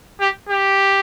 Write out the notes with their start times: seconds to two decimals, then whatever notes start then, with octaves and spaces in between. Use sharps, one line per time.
0.20 G4
0.49 G4